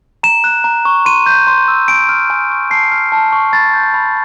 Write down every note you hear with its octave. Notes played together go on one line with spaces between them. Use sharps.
A#5 E7
F#6
A#5
C#6
C6 D#7
G6
C6
E6
G#5 D7
F6
G#5
C#6
A5 C7
F6
A5
C#6
B5 A6
G6
B5